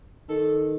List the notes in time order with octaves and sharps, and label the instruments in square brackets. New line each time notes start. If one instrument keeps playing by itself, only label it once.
[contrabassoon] D#3 [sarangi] A4